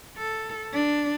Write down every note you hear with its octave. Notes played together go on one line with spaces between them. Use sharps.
A4
D4